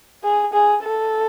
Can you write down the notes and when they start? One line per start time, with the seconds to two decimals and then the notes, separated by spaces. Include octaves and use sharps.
0.23 G#4
0.53 G#4
0.83 A4